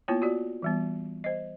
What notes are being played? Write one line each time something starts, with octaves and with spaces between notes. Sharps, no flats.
A#3 B3 E4 F4 C#5 G5
F4 F#4 D5
E3 G3 B3
C5 D#5